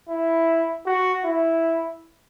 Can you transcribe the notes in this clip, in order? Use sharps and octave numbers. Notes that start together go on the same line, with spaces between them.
E4
F#4
E4